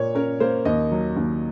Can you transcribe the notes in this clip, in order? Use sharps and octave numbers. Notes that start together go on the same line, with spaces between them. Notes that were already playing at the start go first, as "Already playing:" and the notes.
Already playing: A#2 A#3 C#5
C#4 A#4
A#3 C5
D#2 D#5
F#3
D#2